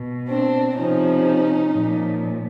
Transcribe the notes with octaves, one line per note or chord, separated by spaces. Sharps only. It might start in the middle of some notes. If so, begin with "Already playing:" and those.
Already playing: B2
C4 D4
C3 F3 C#4 D#4
A#2 F3